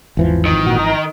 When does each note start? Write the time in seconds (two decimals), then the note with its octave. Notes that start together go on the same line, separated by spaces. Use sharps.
0.17 G#1 E2 E3 F3
0.45 D#3
0.66 A#2 F#4
0.79 A#5